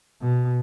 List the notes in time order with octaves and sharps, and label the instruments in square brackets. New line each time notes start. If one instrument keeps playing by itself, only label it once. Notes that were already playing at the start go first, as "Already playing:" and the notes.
[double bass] B2